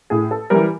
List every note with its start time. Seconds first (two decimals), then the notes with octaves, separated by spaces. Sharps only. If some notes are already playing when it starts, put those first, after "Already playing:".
0.10 A2 G#4
0.31 A4
0.50 E3 G3 A#4